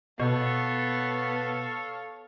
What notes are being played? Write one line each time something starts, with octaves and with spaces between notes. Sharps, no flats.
B2 B3 A4 C#5 F5